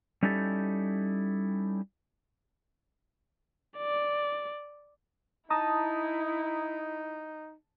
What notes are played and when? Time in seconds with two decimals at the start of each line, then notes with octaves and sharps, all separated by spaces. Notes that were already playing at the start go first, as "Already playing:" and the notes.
0.23 G3 C#4 D#4 E4 G4 A4
3.78 D5
5.50 D#4 E4 A5 A#5 D#6